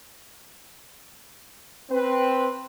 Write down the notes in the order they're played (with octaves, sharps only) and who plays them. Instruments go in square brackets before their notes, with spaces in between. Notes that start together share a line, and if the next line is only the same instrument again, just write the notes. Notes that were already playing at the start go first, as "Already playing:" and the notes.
[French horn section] C4 B4